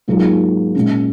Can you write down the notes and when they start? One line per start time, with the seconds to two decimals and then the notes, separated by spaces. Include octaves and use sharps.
0.08 G#2 F#3 A#3 F4 G#4
0.75 A#2 G#3 C#4